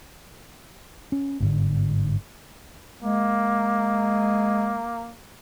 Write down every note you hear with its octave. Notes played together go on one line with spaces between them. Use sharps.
C#4
G1 G#2 D3
G#3 A#3